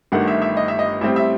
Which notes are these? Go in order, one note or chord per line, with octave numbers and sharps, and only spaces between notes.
G1 G2 D#3 A3 F#5
E5
E5
D#5
E5
D#5
A1 A2 G3 C4 E5
E5